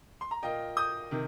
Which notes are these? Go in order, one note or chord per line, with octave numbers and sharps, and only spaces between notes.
C6
A#5
A#2 A#3 F4 D#5 G5
D#6 G6
C3 D#3